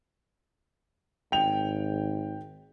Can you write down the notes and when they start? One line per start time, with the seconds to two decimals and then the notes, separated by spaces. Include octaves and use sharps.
1.32 G#1 G5 F7